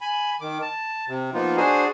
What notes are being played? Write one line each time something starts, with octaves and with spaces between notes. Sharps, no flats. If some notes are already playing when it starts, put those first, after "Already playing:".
G#5 B5
D#3 D6
A5
C3
F3 A#3 B3 D#4 F4
D4 F#4 G#4 C5 G#5